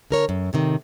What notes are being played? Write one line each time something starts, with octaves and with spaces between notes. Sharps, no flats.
D3 A#4 C#5
F#2
A2 C3 D#3